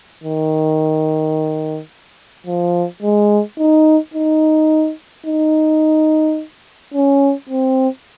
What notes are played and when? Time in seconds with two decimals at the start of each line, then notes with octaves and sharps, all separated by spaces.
0.23 D#3
2.47 F3
3.02 G#3
3.59 D#4
4.14 D#4
5.26 D#4
6.94 C#4
7.49 C4